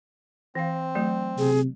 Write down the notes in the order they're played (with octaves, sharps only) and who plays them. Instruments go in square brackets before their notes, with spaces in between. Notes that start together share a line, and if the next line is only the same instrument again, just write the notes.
[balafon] E3 F5 [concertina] C4
[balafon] F#3 A3
[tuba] C3 [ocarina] G#4